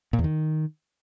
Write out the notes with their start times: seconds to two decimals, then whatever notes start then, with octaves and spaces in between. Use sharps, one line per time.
0.13 A#2
0.19 E2
0.24 D#3